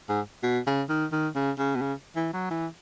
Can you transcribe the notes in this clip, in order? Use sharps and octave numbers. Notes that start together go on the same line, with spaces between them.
G#2
B2
C#3
D#3
D#3
C#3
C#3
B2
C#3
E3
F#3
E3